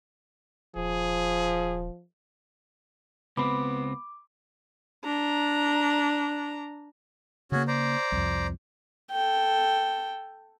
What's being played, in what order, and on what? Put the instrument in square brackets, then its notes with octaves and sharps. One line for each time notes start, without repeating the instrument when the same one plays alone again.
[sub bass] D#1 [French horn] F3 [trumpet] G#4
[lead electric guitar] C#2 C4 [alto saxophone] B3 [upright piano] B5 [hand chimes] D6
[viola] D4 A#5
[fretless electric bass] C#3 A#3 [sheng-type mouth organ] C#4 F#4 G#4
[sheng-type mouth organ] C5 D5 A#5
[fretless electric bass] C2 F2
[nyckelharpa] A4 G5